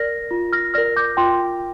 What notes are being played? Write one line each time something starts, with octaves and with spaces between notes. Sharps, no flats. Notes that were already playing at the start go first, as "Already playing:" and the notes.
Already playing: A#4 D5 F6 A#6
F4
F6 A#6
A#4 D5 F6 A#6
D6 G6
F4 G5 C6